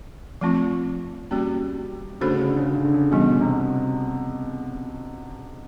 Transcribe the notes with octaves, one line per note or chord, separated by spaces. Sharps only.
F3 A3 C4 F4
G3 A#3 C#4 F#4
C#3 A3 D4 F#4 A4 C5
D3
C#3
D3
C#3
D3
C#3
D3
C#3
B2 E3 G3 B3
C3